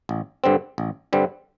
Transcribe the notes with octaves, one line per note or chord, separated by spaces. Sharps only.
A1
G2 D3 G3 C4
A1
G2 D3 G3 C4